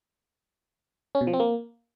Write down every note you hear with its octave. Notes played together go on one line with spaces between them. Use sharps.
C#4
B2
F3
C4
A#3